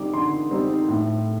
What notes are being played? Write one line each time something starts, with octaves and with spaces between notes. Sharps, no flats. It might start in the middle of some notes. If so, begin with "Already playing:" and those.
Already playing: D3 G3 C4 D#4 D6
D3 C6
G3 C4 D#4
A2